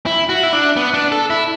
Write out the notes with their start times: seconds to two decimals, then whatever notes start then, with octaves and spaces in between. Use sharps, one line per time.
0.06 E4
0.29 F#4
0.43 E4
0.53 D4
0.77 B3
0.94 D4
1.12 A4
1.30 E4